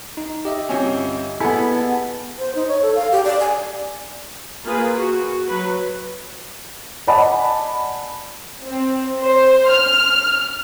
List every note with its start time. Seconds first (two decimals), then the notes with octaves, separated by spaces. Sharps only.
0.17 D#4
0.45 G4 D#5 E5
0.69 G1 C4 C#4
1.40 B3 E4 G#4 A4
2.38 C5
2.55 D#4
2.68 C#5
2.82 A4
2.95 F5
3.12 G4
3.24 D5
3.40 G#5
4.64 A#3 F4 G#4 B4
4.96 F#4
5.47 F#3 B4
7.07 D5 D#5 F#5 G#5 A5 B5
8.66 C4
9.22 C5
9.70 F6